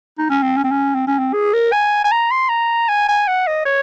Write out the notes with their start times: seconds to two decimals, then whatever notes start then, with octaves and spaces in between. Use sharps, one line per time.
0.18 D#4
0.30 C#4
0.43 C4
0.57 C#4
0.64 C4
0.71 C#4
0.95 C4
1.07 C#4
1.19 C4
1.33 G#4
1.53 A#4
1.72 G#5
2.04 G#5
2.12 A#5
2.31 C6
2.49 A#5
2.89 G#5
3.08 G#5
3.28 F#5
3.47 D#5
3.65 C#5